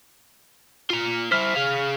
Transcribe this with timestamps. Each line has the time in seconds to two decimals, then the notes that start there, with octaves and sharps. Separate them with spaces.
0.90 F4 A#5
1.32 E4 C5 F6 B6
1.56 G#4 F5